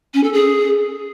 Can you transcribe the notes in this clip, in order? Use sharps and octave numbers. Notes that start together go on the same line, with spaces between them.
C#4
A4
G#4